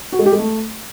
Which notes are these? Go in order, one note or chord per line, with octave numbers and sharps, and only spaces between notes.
F#4
G#3
G4
G#3
A3